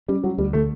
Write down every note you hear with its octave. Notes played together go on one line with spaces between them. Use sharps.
G3 C#4
F#3 G3
D2 G3
D3 A3